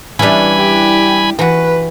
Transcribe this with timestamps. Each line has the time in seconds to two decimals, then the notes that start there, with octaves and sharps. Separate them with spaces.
0.19 E3 G3 C#4 D4 G#5 B5
0.58 G4
1.39 E3 F#4 B4